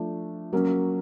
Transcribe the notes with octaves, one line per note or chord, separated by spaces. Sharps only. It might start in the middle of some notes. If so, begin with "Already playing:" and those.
Already playing: F3 A3 D4
F#3 A#3 C#4